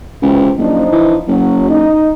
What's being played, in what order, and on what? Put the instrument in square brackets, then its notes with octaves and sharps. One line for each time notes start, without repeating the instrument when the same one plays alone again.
[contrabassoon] C#2 [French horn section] C3 E3 C4
[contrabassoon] F#1 [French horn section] F3 D4 D#4
[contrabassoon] E3
[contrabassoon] F#1 [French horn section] F#3
[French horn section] D#4